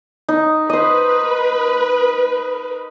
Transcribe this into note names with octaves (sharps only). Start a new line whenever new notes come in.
D#4
B4 C5 D#5